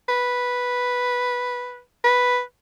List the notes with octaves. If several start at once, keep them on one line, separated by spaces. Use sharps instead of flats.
B4
B4